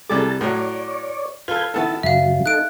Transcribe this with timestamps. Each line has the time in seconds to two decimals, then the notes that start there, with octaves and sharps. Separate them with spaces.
0.09 C2 G3 G#4 A4 A5 D6
0.41 A2 F#3 C#5 D5
1.48 F4 A4 B4 G6 G#6
1.74 D#3 B3 E4 A4 E5 A5
2.03 F#2 C#3 F#3 E5 F5
2.46 D#4 A4 F#6 D7